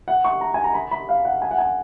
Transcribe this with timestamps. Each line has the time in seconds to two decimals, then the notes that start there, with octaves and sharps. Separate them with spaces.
0.08 F#5
0.25 C#6
0.41 A#5
0.54 G#5
0.64 A#5
0.74 B5
0.91 B5
1.09 F5
1.25 F#5
1.42 G#5
1.51 F#5
1.58 G#5